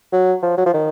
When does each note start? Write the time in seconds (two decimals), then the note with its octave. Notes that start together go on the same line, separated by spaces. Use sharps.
0.12 F#3
0.42 F3
0.58 F#3
0.66 F3
0.74 D#3